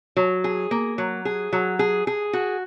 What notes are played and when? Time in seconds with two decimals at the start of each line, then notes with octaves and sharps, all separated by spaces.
0.17 F#3
0.44 G#4
0.71 A#3
0.98 F#3
1.25 G#4
1.53 F#3
1.79 G#4
2.07 G#4
2.33 F#4